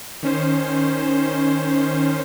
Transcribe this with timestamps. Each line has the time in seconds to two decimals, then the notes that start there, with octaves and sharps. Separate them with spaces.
0.23 D#3 C#4 C5